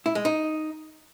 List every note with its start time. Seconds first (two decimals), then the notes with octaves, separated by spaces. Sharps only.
0.06 E4
0.15 G#3
0.25 D#4